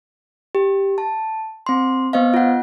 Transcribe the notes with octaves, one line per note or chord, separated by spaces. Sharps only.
G4
A5
C4 C6
B3 C5 D#5 F5
F4 F#5